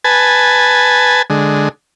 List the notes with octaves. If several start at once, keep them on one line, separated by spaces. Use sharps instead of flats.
B4 G#5 A5
D3 G#3